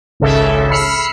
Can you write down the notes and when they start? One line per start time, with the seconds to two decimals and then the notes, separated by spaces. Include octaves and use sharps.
0.20 G#1 C#2 C#3 A4 E5
0.71 B5 E6 F6 C7 C#7